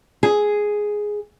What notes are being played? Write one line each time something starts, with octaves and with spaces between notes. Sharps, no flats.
G#4